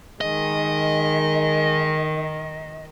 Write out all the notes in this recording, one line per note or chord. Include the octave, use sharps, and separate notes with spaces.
D#3 G#3 D#5